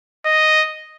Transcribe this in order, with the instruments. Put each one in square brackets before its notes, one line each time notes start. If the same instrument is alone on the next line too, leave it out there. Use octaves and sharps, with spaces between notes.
[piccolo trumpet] D#5